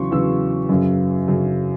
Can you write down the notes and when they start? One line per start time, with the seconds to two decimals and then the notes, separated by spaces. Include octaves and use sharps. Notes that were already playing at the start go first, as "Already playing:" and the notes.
Already playing: E2 C#3 F#3 C6 C#6
0.11 E2 C#3 F#3 E6
0.69 F#2 C#3 F#3
1.28 F#2 C#3 F#3